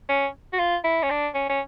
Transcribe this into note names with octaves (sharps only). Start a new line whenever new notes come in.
C#4
F#4
F4
E4
C#4
D4
C#4
C#4